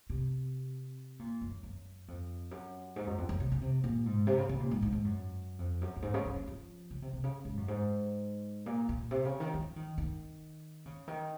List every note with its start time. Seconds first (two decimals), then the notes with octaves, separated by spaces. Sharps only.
0.10 C3
1.19 A#2
1.41 F#2
1.63 F#2
2.08 F2
2.51 F#2
2.96 G#2
3.07 F#2
3.18 F2
3.29 F#2
3.40 C3
3.52 C#3
3.61 C3
3.84 A#2
4.06 G#2
4.27 C3
4.38 C#3
4.49 C#3
4.60 A#2
4.71 G#2
4.82 G#2
4.93 G#2
5.05 F#2
5.59 F2
5.81 F#2
5.96 F#2
6.02 G#2
6.14 C#3
6.25 F3
6.36 F3
6.47 F3
6.91 C#3
7.02 C3
7.13 C3
7.24 C#3
7.45 G#2
7.57 F#2
7.68 G#2
8.66 A#2
8.89 A#2
9.11 C3
9.25 C#3
9.40 D#3
9.54 F3
9.76 D#3
9.98 D#3
10.86 C#3
11.08 D#3